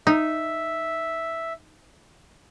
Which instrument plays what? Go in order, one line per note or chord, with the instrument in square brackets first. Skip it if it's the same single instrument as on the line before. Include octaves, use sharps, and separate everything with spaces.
[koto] D#4 [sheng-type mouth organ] E5